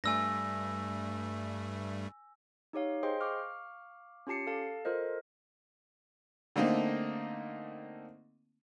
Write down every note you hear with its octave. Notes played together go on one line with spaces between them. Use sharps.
G2 G3 A3 G#5 E6 A#6
D#4 G4 C#5 F5
G#4 C5 D#5 G5 C6
F5 C#6 D6 F6
C#4 F4 G4 A5 C7 C#7
A4 F5 A5
F4 A4 A#4 C5 D#5
D3 A3 A#3 C4 D#4